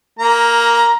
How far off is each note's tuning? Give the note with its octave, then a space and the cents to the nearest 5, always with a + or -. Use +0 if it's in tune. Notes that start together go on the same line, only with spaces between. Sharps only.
A#3 +0 A#5 +15